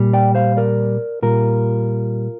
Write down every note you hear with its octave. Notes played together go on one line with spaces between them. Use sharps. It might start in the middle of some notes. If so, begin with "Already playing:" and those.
Already playing: A#2 G3
D5 G5
C5 F5
A#4 D5
A#2 G3 F4 A#4